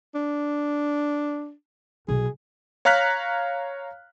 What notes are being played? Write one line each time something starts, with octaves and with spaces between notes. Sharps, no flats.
D4
B1 G#4
C#5 F5 A#5 F6 F#6 B6